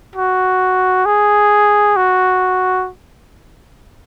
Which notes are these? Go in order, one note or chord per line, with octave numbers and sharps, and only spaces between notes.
F#4
G#4
F#4